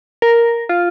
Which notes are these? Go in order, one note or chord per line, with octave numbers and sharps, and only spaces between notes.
A#4
F4